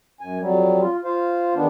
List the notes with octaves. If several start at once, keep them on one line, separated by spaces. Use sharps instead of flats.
F#2 G#5
F2 F#3 G3
F4
F4 C5 F5
E2 D#3 B3 D4